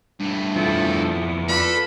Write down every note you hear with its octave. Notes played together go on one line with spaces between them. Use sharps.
G2 A3
F2 F3 B3 E4 A4
F4 A4 B4 D5 B5